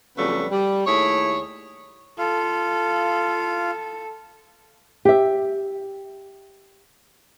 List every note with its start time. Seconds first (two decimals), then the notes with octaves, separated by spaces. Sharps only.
0.17 F2 C#3 F#3 G3 A3 B3
0.51 G3
0.86 D#2 A3 E4 G#4 C#5
2.19 F4 A4 F5
5.05 G4 E5